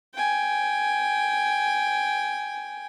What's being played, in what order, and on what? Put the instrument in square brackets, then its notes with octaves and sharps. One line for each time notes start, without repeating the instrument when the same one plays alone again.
[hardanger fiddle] G5 G#5